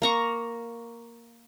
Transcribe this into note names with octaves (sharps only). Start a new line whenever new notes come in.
A#3 A#5 C#6